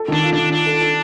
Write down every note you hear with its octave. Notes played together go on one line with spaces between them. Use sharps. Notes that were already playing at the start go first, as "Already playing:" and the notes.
Already playing: A4
D#3 D4
F4
D#3 D4
D4 F4
A4
A4